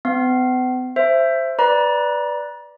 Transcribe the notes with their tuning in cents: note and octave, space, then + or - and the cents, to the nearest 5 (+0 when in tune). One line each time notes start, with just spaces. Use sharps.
B3 +45 F5 +0
C5 +5 E5 +15
B4 +0 D5 +0 A#5 +35